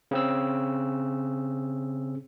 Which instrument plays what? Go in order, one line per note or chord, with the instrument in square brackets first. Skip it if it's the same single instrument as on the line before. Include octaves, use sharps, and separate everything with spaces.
[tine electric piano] C#3 C4 E6